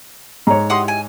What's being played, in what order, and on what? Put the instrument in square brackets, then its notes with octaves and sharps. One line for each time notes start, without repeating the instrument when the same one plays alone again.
[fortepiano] G#2 C#5 [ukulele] A#5
[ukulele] E4 G4 D#5 [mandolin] F#5 C6 D#6
[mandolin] G#5